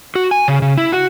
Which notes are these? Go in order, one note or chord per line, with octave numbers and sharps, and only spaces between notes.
F#4
G#5
C#3
C#3
E4
F#4